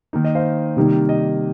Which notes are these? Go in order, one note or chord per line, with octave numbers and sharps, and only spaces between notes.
D#3 A#3 D#4
D#5
C5 F5
C3 D#3 G3 A#3 D#4
D#5